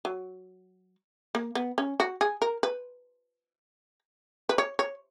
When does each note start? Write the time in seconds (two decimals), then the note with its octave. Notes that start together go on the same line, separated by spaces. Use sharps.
0.05 F#3
1.35 A#3
1.55 B3
1.78 C#4
2.00 F#4
2.21 G#4
2.42 A#4
2.63 B4
4.49 B4
4.58 C#5
4.79 C#5